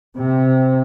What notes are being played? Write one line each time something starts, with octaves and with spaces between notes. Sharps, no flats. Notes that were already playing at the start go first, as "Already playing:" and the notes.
C3